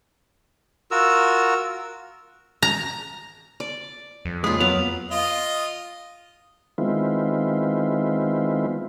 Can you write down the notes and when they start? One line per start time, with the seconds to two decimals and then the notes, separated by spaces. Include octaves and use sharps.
0.91 F4 F#4 A#4 E6
2.63 A#5
3.60 D5
4.25 F2
4.44 C#2 A#2 G#3 F4 B4 D#6
4.60 F#3 A#3 B3 F7
5.11 F4 D#5
6.78 D#3 G#3 B3 C4 E4 F4